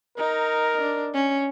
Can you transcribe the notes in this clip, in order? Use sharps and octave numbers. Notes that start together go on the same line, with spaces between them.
D#4 A#4
D4
C#4